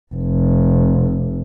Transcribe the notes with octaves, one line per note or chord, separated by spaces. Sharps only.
F1